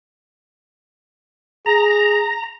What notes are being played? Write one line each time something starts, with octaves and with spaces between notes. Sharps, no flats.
G#4 A#5